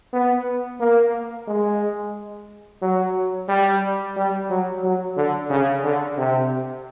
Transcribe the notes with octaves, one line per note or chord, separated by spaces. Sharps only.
B3
A#3
G#3
F#3
G3
G3
F#3
F#3
D3
C#3
D3
C3